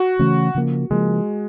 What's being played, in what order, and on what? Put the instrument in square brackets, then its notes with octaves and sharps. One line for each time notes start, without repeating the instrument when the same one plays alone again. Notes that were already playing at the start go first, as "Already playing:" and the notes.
Already playing: [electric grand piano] F#4
[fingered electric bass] C#3 E3 A3 C#4
C#3 F3 A#3
[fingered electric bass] C#3 F3 A#3 [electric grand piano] G#3